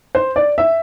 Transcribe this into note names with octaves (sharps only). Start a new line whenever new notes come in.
C5
D5
E5